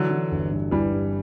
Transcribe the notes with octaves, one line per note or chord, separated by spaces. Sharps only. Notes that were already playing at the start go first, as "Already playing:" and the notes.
Already playing: D3 E3 F#3
E3
G1
G2
G1 E3 G3
G2